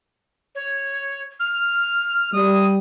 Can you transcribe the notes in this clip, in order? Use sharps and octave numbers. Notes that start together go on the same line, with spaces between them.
C#5
F6
G3 D#6